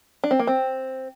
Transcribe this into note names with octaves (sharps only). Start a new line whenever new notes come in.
D4
C4
A#3
C4